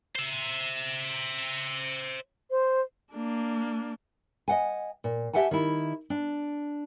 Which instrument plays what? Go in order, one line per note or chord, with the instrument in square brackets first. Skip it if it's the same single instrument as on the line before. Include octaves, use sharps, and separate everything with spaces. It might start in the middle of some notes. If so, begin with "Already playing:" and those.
[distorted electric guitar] C5 E5
[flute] C5
[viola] A#3 D4
[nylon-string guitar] D#5 F#5 G#5
A#2
G4 E5 F#5 G#5 A5
D#3 E4
D4